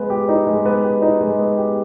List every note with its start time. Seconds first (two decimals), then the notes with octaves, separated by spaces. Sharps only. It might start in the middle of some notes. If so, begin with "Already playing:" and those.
Already playing: G#3 B3
0.10 G4
0.29 D#4
0.47 G#3
0.65 B3
0.83 G4
1.02 D#4
1.21 G#3
1.39 B3
1.57 G4